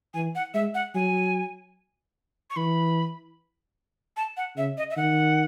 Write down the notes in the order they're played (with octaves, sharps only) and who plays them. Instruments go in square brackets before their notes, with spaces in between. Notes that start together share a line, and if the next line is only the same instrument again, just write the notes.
[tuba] E3 [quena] G#5
[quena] F#5
[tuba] G#3 [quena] E5
[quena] F#5
[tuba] F#3 [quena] G#5
[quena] C#6
[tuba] E3 [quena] B5
[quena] A5
F#5
[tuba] C#3 [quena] E5
[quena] D#5
E5
[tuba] D#3 [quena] F#5